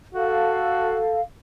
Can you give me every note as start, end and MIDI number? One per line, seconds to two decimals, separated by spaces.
0.14 1.02 66
0.14 1.21 69
0.14 1.21 77